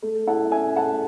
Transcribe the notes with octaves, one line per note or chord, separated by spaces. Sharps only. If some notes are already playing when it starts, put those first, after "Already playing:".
A3
E4 F#5 A5
C#4 E5 G#5
A3 F#5 A5